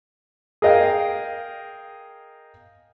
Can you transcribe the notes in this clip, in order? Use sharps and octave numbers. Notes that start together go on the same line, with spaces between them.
G#4 A#4 D#5 F5 G5